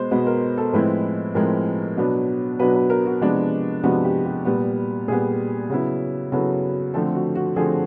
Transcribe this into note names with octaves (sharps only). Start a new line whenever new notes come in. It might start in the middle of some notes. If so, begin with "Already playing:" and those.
Already playing: B2 G#3 B3 C5
B2 G#3 B3 B4
A#4
A4
A2 F3 G#3 C4 E4 B4
A2 F3 G#3 C4 E4 A#4
B2 F#3 B3 D4
B2 F#3 B3 D4 B4
B4
A#4
F#4
C3 F3 G#3 B3 D4
C3 F3 G#3 B3 D4 F#4
G4
G4
A#2 G3 B3
A#2 G3 B3 G#4
C#3 F#3 B3 E4
C#3 F#3 B3 E4 A4
D3 F3 A3 C4 A4
F#4
F#4
D3 F3 A3 C4 G#4